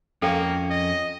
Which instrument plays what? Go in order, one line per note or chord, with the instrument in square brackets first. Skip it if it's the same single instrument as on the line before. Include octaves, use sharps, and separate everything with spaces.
[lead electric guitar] F2 C#4 [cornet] A#3 [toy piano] A4 [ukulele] F5 G5
[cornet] D#5